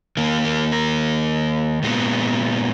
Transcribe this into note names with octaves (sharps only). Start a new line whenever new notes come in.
D#3 A#3 A#4
A#4
A#4
A#2 G#3 B3